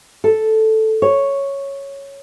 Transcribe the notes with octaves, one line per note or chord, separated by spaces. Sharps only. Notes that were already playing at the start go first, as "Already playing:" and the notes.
A4
C#5